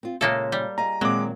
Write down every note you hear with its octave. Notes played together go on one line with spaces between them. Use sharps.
C4 F4
A#2 C#3 G#3 A#3 A4 E5
G3
F4 G#4 D#5 A#5
A#2 D#3 F#3 G#3 C4 D6